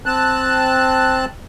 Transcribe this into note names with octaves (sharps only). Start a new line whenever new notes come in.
C4 A5 F#6